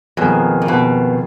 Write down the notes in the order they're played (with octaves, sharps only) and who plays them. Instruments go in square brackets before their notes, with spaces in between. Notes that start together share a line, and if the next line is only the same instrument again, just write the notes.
[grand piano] F2 D#3 A#3 F4 G#4 [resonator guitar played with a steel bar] B2
[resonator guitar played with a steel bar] A#2
B2